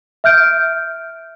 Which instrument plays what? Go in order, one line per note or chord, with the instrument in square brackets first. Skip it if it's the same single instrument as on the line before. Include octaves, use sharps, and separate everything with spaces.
[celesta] E5 F6 G6 D7